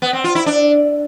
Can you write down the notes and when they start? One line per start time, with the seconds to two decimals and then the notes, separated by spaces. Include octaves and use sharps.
0.02 B3
0.13 C4
0.24 F4
0.35 E4
0.46 D4